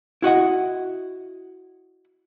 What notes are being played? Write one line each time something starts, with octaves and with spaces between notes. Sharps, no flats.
E4 F#4 D#5 F#5